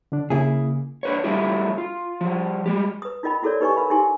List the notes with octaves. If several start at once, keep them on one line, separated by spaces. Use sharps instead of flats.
D3 D4
C#3 A#3 E4 G#4
D4 B4 C#5
F#3 G3 A3 E4 F4 G4
F4
F3 G3
G3 G#3 G4
B4 D#6
D#4 F4 A#4 D#5 G5 B5
E4 F#4 A4 A#4 C#5 D5
D#4 G4 B4 D#5 G#5 C#6
A#4 B4 F5 B5
D#4 E4 G4 A#4 G#5 C6